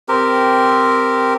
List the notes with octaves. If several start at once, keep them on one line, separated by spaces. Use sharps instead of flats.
C4 G4 A#4